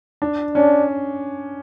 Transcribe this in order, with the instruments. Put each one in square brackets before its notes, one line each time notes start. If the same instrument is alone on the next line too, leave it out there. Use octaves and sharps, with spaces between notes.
[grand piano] D4
[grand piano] C#4 [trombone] D4